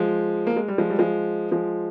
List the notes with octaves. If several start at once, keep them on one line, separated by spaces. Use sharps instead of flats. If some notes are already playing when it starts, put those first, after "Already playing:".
Already playing: F3 G#3
A#3
G#3
G3
F3 G#3
G3
F3 G#3
F3 G#3